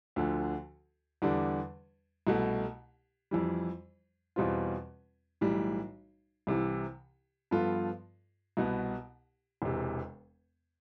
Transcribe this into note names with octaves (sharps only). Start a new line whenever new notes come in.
D2 D3 F3
E2 D3 G3 D4
C2 B2 A3
F2 E3 G3
E2 B2 G3 C4 F4
B1 A2 E3 G3
C2 C3 E3
G2 F3 B3 F4 A4
C2 B2 B3
E1 E2 C3